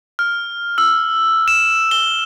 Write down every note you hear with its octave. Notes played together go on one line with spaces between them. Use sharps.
F6
E6
E7
G7